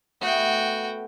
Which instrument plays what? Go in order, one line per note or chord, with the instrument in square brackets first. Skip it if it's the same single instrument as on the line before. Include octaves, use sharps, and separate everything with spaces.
[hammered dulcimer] A3 B3 [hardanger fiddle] F#4 G5